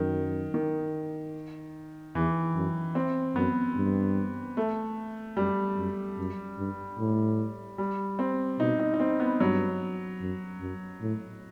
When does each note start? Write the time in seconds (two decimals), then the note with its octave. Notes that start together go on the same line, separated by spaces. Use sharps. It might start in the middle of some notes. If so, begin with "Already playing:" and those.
Already playing: F#2 D#3
0.54 D#3
2.15 E2 E3
2.55 F#2
2.95 C4
3.35 F#2 B3
3.76 G2
4.57 A3
5.37 F#2 G3
5.77 F#2
6.18 F#2
6.58 G2
6.99 A2
7.78 G3
8.19 C4
8.59 B2 D#4
8.80 D#4
8.94 D#4
9.00 C4
9.20 B3
9.40 G2 F#3
10.21 F#2
10.60 F#2
11.01 A2